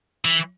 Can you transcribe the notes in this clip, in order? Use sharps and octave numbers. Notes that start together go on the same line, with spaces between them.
E3